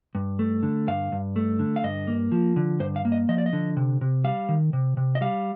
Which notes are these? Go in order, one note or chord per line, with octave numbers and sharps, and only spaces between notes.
G2
A3
D3
G2 F5
G2
A3
D3
F5
G2 D#5
A#3
F3
D3
G2 C5
F5
A#3
D#5
F3 D#5
D5
D#5
D3
C3
C3
G3 F5
D#3
C3
C3
D#5
G3 F5